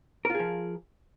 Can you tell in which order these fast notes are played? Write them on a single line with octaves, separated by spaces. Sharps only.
A#4 F4 G#4 F3